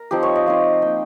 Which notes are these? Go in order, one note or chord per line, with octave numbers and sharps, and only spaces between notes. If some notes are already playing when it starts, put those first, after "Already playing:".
Already playing: A#4
F3 C4 D#4 G4
C#5
D#5
F3 C4 D#4 F5
A#3 D#4 G5